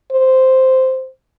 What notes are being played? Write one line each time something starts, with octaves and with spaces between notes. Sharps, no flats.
C5